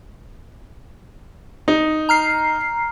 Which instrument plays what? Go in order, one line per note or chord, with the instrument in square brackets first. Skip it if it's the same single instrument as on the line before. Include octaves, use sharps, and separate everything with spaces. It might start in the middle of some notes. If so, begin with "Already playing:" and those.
[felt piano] D#4
[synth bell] A#5 F6 C7